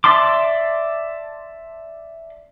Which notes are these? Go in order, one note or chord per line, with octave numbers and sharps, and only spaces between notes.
D5 E5 A5 C6 D6